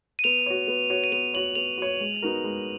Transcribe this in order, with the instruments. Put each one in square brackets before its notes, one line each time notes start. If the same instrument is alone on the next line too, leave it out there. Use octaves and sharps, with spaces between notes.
[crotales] D#7
[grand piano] B3 [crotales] F7
[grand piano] F#4 C#5
B3
F#4 C#5
[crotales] D#7
[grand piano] B3 [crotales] F7
[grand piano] F#4 C#5 [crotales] F#7
[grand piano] B3 [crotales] F7
[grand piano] F#4 C#5
G#3
B3 D#4 F#4 A#4
G#3